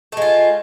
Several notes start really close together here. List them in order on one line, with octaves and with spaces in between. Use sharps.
A3 G#3 F4